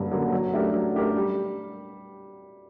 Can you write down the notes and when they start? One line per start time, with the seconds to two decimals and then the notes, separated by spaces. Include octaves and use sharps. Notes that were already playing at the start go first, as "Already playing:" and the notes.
Already playing: G2 D3 F#3 A#3
0.11 D3 F#3 A#3
0.32 F#3
0.53 A3 D4 G4 A#4
0.74 F#3
0.95 A3 D4 G4 A#4
1.15 G3